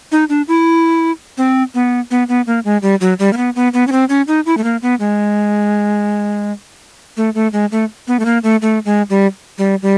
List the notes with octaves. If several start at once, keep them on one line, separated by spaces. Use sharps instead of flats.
D#4
D4
E4
C4
B3
B3
B3
A#3
G#3
G3
F#3
G3
A#3
B3
B3
B3
C#4
C4
C#4
D#4
E4
A3
A#3
B3
G#3
A3
A3
G#3
A3
B3
A3
A#3
A3
A3
G#3
G3
G3
G3